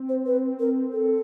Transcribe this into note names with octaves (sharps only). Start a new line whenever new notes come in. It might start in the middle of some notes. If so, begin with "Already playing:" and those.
Already playing: C4
C5
B4
A#4
A4